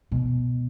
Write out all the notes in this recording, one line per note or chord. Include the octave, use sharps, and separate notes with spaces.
B2